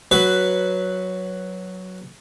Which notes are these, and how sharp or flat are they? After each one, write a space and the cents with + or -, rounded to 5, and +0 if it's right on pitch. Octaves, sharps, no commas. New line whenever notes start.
F#3 +0 B4 +0